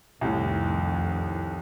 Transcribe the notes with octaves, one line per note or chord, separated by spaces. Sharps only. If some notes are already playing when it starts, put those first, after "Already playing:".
C2 F2 A2 D#3